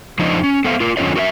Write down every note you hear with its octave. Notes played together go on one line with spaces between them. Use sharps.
F2 F3 D4 D#4 C5 D#5
C#4
B3 A4 C5 E5 F5
F4 A#4
F2 D3 C#4 F4 C#5 D#5
F#4 A#4 D#5 E5